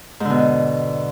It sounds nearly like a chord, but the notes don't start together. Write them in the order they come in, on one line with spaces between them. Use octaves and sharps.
G#2 D3 B2